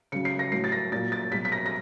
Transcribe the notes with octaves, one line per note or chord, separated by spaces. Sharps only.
C#3 F#3 C#7
C7
A#6
A2 F#3 C7
A6
A#6
A#2 F#3 A6
A6
B2 F#3 B6
B6
A#6
A#6